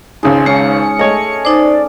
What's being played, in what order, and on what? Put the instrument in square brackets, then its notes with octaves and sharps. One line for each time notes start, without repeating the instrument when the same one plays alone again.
[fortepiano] G#1 C#2 G#2 [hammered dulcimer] G#4 C6
[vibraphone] G#3 [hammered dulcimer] C#4 [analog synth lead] C#7
[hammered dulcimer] A3 [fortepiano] G#4 C#5 D#5
[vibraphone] D#4 C5 [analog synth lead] D5